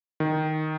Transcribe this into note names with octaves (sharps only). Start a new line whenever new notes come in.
D#3